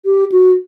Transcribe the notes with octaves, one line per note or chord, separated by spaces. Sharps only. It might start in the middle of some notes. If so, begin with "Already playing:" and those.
G4
F#4